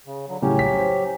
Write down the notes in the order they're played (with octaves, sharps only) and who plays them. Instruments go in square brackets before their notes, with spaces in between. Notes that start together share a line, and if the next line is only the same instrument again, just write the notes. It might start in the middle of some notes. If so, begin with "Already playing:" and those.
[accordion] C#3
D3 F#3
[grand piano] A2 C#3 G3 [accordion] F#3 C#4 G4
[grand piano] B6
C5